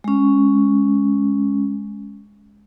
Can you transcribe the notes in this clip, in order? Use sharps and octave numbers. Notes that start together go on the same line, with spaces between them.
G#3 C#4